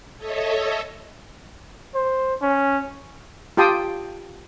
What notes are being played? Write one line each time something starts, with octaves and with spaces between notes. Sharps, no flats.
A4 C#5 D#5 E5
C5
C#4
F4 G4 G5 A5 C6 D#6